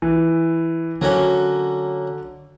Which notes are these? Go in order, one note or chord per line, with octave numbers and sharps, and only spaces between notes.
E3
D3 F#3 A#3 C#4